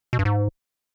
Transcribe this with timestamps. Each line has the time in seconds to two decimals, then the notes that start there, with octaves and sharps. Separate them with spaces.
0.13 B2
0.19 G2
0.25 G#2